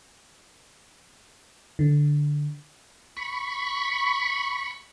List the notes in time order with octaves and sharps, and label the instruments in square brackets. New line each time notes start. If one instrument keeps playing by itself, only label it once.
[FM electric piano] D3
[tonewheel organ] B5 C#6